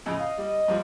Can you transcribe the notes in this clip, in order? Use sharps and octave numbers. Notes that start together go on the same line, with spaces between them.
F2 A2 C#3 D#5
F5
G3
G2 F3 G3